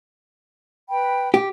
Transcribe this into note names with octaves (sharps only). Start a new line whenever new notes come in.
B4 G5 B5
G4